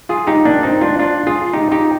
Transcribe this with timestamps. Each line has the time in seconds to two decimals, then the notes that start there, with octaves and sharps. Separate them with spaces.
0.09 F4 G#4
0.27 D#4 G4
0.45 A#3 D4
0.63 C4 D#4
0.81 D4 F4
0.99 D4 F4
1.27 F4 G#4
1.53 D#4 G4
1.72 D#4 G4